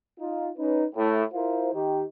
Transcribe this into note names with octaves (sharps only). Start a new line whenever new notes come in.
D#4 F4
C#4 D#4 B4
A2
E4 F4 A#4 C5
D#3 G4